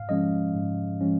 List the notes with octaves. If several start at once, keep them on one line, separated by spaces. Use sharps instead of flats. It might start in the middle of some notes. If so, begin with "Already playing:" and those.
Already playing: G#2 F5
F3 G#3 C#4 D#5
G#2
F3 G#3 C#4